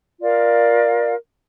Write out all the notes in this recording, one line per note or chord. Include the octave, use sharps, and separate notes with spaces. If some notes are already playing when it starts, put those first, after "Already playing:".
F4 A#4 D5 F5